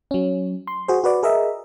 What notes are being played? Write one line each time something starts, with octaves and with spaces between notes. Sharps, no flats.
F#3 C#4
C6
F#4 G#4 C5
F#4 B4 D5
G#4 A#4 D#5 E5